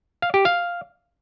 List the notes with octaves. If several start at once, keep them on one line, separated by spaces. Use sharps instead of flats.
F5
G4
F5